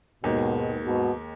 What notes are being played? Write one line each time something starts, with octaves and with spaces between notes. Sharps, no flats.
D#2 G#2 B2 D#3 G#3
G#2 B2